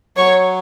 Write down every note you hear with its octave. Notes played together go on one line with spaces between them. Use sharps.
F#3 C#5 C#6